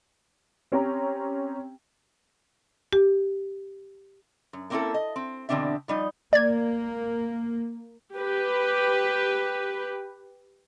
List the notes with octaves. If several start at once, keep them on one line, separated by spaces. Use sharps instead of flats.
C4 C#4 G4 G5 A#5
G4
F#2
A3 A#3 C4 C#4 E4 A4
D#5
C4
E2 B2 D3 C4 D4 E5
F3 G3 D#4
A#3 D5 G#6
G4 B4